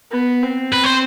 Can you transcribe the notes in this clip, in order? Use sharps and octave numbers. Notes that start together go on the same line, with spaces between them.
B3
C4
B4
C5